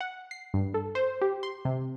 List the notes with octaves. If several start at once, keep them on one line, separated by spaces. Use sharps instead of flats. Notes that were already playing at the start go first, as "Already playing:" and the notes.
F#5
C7
G2
A4
C5
G4
C6
C3